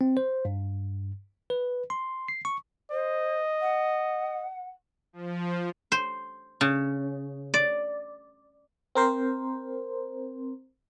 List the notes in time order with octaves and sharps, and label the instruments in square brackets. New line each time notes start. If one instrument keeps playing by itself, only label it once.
[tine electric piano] C4
C5
G2
B4
C6
C7
C#6
[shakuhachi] C5 [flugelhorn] D#5
[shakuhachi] F#5
[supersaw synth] F3
[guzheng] C5
C#3
D5
[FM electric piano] C4 A#4 C5